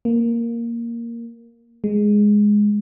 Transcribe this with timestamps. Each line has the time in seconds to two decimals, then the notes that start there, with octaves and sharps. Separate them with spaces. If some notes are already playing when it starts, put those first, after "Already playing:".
0.05 A#3
1.84 G#3